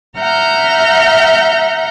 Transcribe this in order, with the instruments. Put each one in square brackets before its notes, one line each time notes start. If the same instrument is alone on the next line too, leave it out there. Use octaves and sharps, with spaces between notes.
[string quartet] E5 F#5 A#5 F6 G6